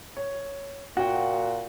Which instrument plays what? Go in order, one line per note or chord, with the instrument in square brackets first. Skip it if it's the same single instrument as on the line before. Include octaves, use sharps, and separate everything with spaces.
[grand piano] C#5
[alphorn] A#2 [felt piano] F#4 [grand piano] F#5 G5